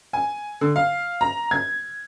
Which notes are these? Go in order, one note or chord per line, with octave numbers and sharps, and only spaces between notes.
G#5
D3
F5
A#5
G#6